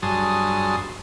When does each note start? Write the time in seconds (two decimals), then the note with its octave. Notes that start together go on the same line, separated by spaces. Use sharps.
0.02 G2 F#3 G#4 A5 C6 D#6